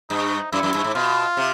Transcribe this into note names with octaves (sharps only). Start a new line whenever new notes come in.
G2 D#4
F#2 E4
F#2
G2
G#2
B2 F4
C3